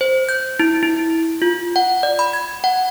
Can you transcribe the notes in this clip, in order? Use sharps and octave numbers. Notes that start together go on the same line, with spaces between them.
C5
G6
E4
E4
F4
F#5
D5
B5
G#6
F#5